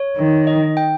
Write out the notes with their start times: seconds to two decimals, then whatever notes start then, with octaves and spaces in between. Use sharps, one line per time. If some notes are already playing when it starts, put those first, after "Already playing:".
Already playing: C#5
0.17 D#3
0.47 D#5
0.77 G5